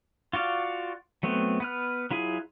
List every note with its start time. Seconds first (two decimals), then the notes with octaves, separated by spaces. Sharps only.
0.33 F4 F#4 D5 F5
1.23 F#3 A3 B3 C4
1.60 B3 B4 F6
2.11 F#3 E4 F4 G#4